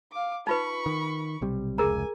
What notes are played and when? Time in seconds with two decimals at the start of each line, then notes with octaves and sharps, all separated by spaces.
0.12 F5 D6
0.47 D#4 F4 B4 B5 C#6
0.86 D#3
1.41 B1 C3 G3
1.78 F1 C#2 G#4 A#4 G#5 A#5